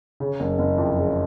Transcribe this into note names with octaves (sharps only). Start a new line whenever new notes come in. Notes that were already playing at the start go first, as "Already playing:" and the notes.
C#3
F#1
F#1
F2
C#3